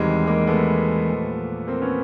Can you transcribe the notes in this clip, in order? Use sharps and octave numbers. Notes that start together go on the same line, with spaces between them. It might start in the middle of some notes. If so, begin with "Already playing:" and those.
Already playing: E2 C3 D#3 G3 G#3
G#3 A#3
A3 B3
A#2 F3
A#3 C4
B3 C#4